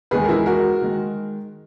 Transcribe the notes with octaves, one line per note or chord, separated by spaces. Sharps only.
E2 D#3 G#3 G#4 B4
A#4
E4 G#4
F#4 A#4
D#3 G#3